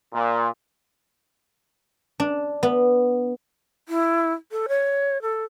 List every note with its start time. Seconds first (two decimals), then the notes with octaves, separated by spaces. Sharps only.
0.14 A#2
2.20 D4
2.63 B3
3.88 E4
4.51 A4
4.68 C#5
5.22 A4